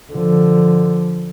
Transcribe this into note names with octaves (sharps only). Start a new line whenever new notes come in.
D3 F3